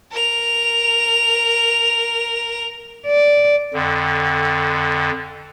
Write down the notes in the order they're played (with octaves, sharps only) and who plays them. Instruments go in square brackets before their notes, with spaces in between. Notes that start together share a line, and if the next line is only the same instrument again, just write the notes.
[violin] A#4 F7
[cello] D5
[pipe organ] F2 D3